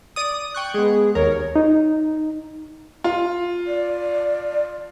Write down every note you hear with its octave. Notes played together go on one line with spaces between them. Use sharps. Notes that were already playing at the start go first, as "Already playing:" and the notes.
D5 D#6
G5 C#6 F#6
G#3 B3 G#4
D#2 A#4 C#5
D#4
F4
D5